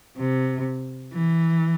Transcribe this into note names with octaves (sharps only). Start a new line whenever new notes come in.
C3
E3